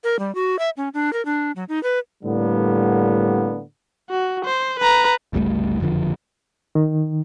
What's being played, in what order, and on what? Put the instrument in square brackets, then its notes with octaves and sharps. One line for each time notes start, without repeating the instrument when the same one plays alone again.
[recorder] A#4
G3
F#4
E5
C#4
D4
A#4
D4
F#3
D#4
B4
[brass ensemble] A2 D3 G3 A#3 B3
[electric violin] F#4
C5
B4 A#5
[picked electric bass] G1 C#2 G3 A3
F#1 F2 D3 F3
[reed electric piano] D#3